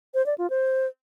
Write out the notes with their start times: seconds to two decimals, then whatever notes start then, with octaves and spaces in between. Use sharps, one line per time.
0.14 C5
0.26 D5
0.38 F4
0.50 C5